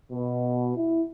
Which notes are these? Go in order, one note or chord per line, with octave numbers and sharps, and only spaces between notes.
B2
E4